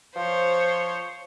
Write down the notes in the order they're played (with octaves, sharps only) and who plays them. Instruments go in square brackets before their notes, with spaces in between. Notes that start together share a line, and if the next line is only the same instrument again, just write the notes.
[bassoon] F3 [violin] C5 C#5